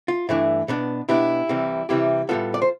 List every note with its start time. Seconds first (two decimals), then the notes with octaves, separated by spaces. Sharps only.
0.08 F4
0.29 G2 E3 A3 D4 E4
0.68 B2 B3 D4
1.09 B2 B3 D4 E4 G4
1.49 C2 C3 E3 G3
1.89 C2 C3 E3 G3 E4 G4
2.29 A2 G3 B3 F4 A4
2.54 D5
2.62 C5